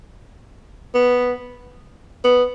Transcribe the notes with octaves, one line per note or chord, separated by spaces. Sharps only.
B3
B3